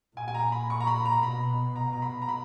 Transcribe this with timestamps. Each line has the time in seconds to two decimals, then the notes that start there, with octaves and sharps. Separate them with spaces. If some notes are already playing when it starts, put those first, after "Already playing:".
0.16 A#2 G#5
0.28 G#5
0.34 A#5
0.52 B5
0.70 C#6
0.80 A#5
0.87 B5
1.05 A#5
1.23 B2 B5
1.76 A#5
1.93 A#5
2.02 B5
2.22 A#5
2.29 B5